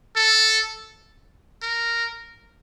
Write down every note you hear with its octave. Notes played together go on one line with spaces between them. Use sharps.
A4
A#4